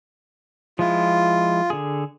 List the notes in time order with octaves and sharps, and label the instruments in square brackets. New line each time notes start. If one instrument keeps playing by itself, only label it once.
[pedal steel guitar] F3 G#3 E4 [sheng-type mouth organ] F4
[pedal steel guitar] D3 G#4